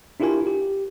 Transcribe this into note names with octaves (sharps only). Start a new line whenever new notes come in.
D4 E4 F4 G4 A#4 G#5
G4